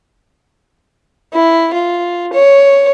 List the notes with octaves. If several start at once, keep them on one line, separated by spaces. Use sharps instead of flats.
E4
F4
C#5